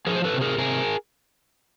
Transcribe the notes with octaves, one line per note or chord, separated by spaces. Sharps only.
F3 G#4 A#4
C5
A4 B4
C3
G#4 A#4
C3 G#4 A#4